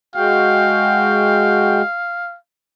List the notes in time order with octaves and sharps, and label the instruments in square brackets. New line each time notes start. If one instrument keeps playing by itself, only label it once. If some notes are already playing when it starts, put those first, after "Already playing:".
[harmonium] G#3 F#4 G5 [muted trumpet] F5